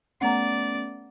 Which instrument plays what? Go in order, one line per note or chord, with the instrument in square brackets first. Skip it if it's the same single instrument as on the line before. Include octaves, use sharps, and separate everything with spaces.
[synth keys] A3 B3 C#4 [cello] D5 [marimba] F#5 A#5